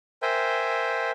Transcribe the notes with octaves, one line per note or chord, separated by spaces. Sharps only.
A#4 C5 E5 G5 G#5